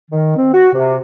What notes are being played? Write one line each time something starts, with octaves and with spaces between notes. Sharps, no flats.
D#3
C4
F#4
C3